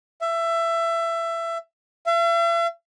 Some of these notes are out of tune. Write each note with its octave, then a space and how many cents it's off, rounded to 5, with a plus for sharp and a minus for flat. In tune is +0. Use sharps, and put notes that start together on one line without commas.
E5 +20
E5 +45